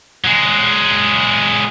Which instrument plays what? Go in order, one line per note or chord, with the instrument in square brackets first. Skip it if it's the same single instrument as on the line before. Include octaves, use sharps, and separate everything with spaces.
[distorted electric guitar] F#3 G#3